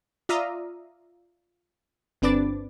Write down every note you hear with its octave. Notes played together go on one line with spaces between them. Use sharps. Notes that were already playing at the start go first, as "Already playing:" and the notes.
F4 D5 E5 F5 A#5 D#6
G1 C4 D4 B4 D6 A6